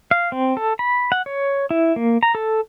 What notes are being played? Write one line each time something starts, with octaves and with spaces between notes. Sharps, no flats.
F5
C4
A4
B5
F#5
C#5
E4
A#3
A#5
A4